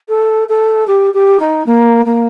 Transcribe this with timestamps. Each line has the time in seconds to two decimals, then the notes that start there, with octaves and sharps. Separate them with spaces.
0.09 A4
0.49 A4
0.87 G4
1.14 G4
1.39 D#4
1.66 A#3
2.05 A#3